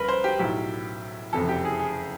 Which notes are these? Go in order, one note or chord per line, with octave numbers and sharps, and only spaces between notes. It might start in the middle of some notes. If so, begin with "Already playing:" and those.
Already playing: C#2 C#3 G3 A#4 B4
C5
G4
B1 A2 F#3 G4
F#1 F2 C3 E3 A4
G4
G#4
G#4